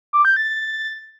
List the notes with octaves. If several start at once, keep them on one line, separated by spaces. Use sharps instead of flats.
D6
G6
A6